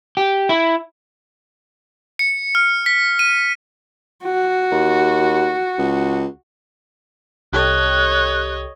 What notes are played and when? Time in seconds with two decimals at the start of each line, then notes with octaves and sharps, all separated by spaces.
0.17 G4
0.49 E4
2.19 C#7
2.55 F6
2.86 B6
3.19 D#7
4.24 F#4
4.71 D#2
5.79 C#2
7.53 C2 G4 A4 C#5 D#5 F#6